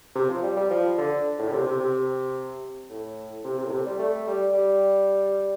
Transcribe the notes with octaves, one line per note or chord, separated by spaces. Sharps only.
C3
F3
G3
G3
F3
D3
A2
D3
C3
C3
C3
A2
C3
C3
A2
C3
G3
A3
G3
G3